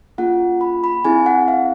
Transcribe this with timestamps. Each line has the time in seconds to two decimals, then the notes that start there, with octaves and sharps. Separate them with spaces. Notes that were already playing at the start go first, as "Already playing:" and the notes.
0.18 A#3 C#4 F4 G#4 F#5
0.61 B5
0.84 B5
1.05 C4 E4 G#4 G#5
1.26 F#5
1.48 F5